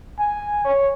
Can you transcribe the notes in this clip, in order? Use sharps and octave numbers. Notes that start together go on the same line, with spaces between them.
G#5
C#5